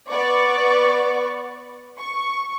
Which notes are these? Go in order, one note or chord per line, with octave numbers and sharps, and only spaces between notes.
B3 D5 C#6
C#6